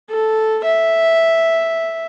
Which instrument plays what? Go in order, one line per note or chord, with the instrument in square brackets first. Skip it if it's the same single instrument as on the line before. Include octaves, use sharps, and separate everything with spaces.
[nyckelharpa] A4
E5